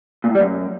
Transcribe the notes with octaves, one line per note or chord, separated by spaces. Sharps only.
A#2
A2
G3
F#2